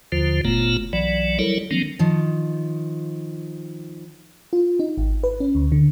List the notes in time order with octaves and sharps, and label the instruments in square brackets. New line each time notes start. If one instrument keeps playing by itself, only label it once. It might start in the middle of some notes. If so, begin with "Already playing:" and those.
[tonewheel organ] D#2 D3 F3 F4 C5
F#1 A#2 A3 B3 F4 A#5
B1 E3 F#3 D5
F#3 G3 E4 A4 A#4 C#5
D#3 F3 F#3 A#3 C4 D4
[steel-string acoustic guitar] D#3 F3
[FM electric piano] F4
D#4
G#1
B4
C#4
D2
D3